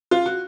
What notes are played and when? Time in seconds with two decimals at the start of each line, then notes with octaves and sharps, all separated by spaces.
0.11 F4
0.26 F#4